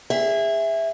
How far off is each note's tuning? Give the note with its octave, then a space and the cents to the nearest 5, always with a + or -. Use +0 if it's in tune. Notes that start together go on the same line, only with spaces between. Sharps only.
G#4 -25 E5 +0